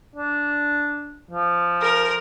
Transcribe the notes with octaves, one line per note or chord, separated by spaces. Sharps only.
D4
F3
A#4